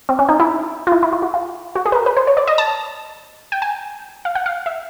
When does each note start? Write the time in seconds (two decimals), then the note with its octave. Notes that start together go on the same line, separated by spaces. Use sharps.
0.09 C4
0.19 C#4
0.29 D#4
0.40 E4
0.87 F4
0.92 E4
1.03 E4
1.13 F4
1.22 F#4
1.34 F4
1.75 F#4
1.85 G#4
1.92 B4
1.95 A#4
2.06 B4
2.17 C5
2.27 C#5
2.37 D5
2.47 D#5
2.58 A5
3.52 G5
3.62 G#5
4.25 F5
4.35 F#5
4.46 F5
4.66 E5